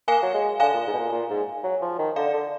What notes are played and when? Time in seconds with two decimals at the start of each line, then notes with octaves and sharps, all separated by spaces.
0.08 A#3 F5 G#5
0.23 F#3
0.34 G#3
0.60 D3 F5 G#5
0.74 A#2
0.87 G#2
0.93 B2
0.99 A#2
1.12 A#2
1.30 G#2
1.64 F#3
1.82 F3
1.99 D#3
2.16 D3 D5 F5
2.34 D3